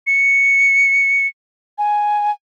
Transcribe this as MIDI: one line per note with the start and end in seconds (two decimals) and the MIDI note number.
0.07 1.27 97
1.78 2.31 80